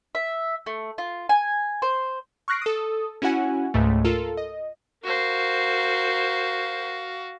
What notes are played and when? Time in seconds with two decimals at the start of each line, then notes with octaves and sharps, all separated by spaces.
0.15 E5
0.66 A3
0.98 F4
1.29 G#5
1.82 C5
2.48 C#6 F6 F#6 A#6 C7 D7
2.62 A4 D#6
3.22 C#4 E4 F#4 F#5 G#5
3.74 C#2 G#2 A3
4.04 F4 A4 A#4
4.37 D#5
5.04 F#4 A#4 C5 F5